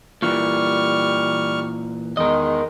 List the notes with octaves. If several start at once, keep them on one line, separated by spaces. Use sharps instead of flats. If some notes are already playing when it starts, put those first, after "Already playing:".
A#2 E3 G3 C#6 F6
E2 D#3 G#3 A#4 D#5